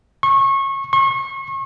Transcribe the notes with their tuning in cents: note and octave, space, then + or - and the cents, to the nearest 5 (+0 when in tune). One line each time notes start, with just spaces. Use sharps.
C#6 -25
C#6 -35